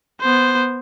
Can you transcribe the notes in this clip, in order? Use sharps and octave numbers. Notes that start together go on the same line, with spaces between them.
B3 C5